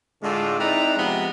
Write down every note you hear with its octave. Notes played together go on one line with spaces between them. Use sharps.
A2 D3 G#3 A3 D4 F4
C4 D#4 E4 B4 D5 A#5
C3 F3 G#3 B3